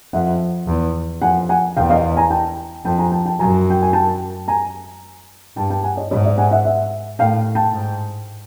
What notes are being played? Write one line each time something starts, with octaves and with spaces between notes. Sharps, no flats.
F2 E5 F#5
E2
F2 F#5 G#5
F#5 G#5
E2 F5 G5
D#5 F5
G#5 A#5
G5 A5
F2 G5 A5
G#5 A#5
G5 A5
G5 A5
F#2 G#5 A#5
G5
G#5
G5 A5
G#5 A#5
G2 G5 A5
G5 A5
F#5 G#5
C#5 D#5
G#2 C#5 D#5
D5 E5
F#5 G#5
E5 F#5
E5 F#5
A2 F5 G5
G5 A5
G#2